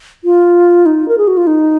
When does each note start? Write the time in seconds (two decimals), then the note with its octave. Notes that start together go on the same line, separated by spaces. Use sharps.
0.24 F4
0.86 D#4
1.08 A#4
1.18 G#4
1.28 F#4
1.37 F4
1.47 D#4